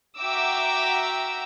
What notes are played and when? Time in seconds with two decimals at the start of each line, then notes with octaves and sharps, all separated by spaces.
0.19 F#4 E5 G5 A#5 D6 E6